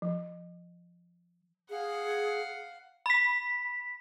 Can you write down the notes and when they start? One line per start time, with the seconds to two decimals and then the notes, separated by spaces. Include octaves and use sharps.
0.02 F3
1.70 G#4 F5 F#5
3.06 B5 B6